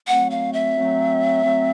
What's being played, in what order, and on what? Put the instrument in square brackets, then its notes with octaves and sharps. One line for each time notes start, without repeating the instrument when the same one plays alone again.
[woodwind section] F#3 A3 C4 [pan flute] F#5
[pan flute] F5
E5
[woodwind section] F#3 A3 C4
F#3 A3 C4